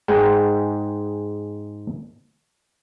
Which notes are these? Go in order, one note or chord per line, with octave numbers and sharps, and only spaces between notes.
G#2 G#3 G#4 F#5 G5